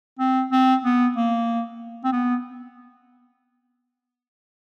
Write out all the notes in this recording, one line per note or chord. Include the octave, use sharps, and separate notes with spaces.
C4
C4
B3
A#3
C4
B3